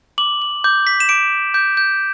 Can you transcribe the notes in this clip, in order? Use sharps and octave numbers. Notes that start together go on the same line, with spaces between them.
D6 F#7
F#7
D6 G6
B6
E7
D6 D7
D6 G6
G6